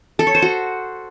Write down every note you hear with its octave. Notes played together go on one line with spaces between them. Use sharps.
A4
C#5
C5
F#4